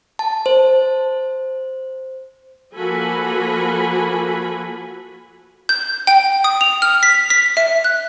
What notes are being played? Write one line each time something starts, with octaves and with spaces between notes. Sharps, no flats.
A5
C5
F3 A#3 F#4 A4 G#5 B5
G6
G5
D#6
F7
F6
B6
B6
E5
F#6